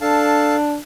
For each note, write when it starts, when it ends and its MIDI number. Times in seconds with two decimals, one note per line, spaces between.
0.01 0.77 62
0.01 0.56 69
0.01 0.56 77
0.01 0.56 81